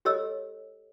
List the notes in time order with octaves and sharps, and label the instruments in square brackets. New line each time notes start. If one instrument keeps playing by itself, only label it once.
[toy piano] G4 A4 C#5 D#5 E6